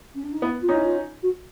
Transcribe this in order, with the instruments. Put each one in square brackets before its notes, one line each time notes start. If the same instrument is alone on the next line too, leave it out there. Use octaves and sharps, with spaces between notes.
[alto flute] C#4
D4
D#4
[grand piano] B3 [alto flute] E4
[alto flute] F4
[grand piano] C#4 D#4
[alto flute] E4
F4
F#4